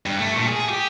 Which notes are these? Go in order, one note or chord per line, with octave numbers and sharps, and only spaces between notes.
G2
A3
A#2
G#4
G4